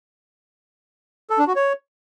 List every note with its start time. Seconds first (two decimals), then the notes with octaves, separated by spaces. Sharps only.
1.30 A4
1.39 D4
1.47 F#4
1.56 C#5